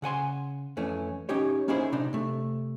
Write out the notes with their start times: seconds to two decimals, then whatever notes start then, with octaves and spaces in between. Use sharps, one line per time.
0.02 C#3 F#5 G#5 C6
0.77 F2 E3 A3 C#4
1.29 C#4 D#4 G4 C#5
1.68 A#3 C#4 D#4 E4 G#4 C5
1.92 C3 D4 D#4
2.13 C3 A3